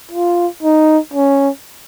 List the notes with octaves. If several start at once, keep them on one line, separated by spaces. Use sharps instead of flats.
F4
D#4
C#4